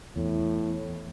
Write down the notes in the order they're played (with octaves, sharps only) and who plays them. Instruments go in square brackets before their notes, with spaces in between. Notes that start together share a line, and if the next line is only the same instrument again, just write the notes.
[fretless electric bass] E2 [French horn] A2